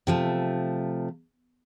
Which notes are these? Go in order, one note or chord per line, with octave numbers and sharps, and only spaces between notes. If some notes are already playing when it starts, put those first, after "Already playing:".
C3 F3 A3